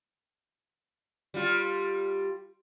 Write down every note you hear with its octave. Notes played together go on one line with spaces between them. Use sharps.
G3 F4